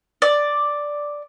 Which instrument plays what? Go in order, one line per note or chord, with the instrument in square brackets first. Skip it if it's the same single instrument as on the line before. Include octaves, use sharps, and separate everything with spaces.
[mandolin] D5